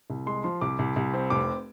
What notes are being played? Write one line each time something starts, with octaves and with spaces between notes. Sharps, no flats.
C2
G#3 C6
F3 C6
C2 D6
C2
C2
C4
F1 D6